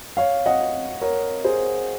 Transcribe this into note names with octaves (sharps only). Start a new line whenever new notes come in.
C#5 F5
D#5 F#5
A#4 C#5
G#4 C5